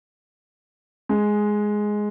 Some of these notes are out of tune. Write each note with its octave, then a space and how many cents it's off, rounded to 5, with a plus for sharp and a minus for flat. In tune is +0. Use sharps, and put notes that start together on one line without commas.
G#3 +5